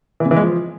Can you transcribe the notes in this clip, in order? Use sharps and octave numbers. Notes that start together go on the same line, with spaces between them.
E3
C#3
E3
G#3
F3